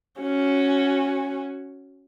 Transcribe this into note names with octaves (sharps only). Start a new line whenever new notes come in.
C#4 F#4